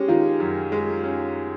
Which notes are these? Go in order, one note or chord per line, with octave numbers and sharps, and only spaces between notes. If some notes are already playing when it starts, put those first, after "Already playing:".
Already playing: G#3 C#4 G4
D#3 F4
F#2
G#3
C#4